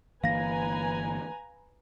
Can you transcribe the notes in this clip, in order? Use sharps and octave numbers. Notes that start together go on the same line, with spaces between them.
G1 E3 A#3 B4 F5 G#5 A#5 A#6